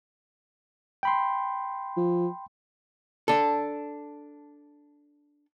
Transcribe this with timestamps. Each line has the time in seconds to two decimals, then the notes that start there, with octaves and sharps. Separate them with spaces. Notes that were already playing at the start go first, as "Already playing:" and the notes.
1.03 G5 B5 C6
1.97 F3
3.28 D4 A4